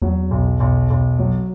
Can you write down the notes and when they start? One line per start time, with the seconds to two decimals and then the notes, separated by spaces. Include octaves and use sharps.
0.02 E2 F#3
0.31 B1
0.60 B1
0.90 B1
1.19 F#3